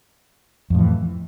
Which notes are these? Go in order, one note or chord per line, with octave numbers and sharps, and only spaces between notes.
F2 A2 E3